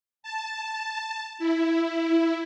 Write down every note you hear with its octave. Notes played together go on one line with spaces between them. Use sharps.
A5
E4